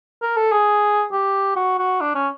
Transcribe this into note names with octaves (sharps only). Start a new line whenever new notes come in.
A#4
A4
G#4
G4
F#4
F#4
D4
C#4